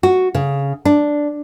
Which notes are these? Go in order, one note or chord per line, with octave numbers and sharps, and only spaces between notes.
F#4
C#3
D4